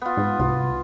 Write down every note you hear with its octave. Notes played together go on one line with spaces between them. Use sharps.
B3 F4
G#2
C2 F4